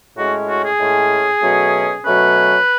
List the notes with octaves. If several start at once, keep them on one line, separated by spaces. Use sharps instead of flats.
A2 G#3 C#4 F#4
F#4
G#4
A2 G#3 C#4
B2 F#3 A3 C#4
B2 F#3 A3 C#4 B4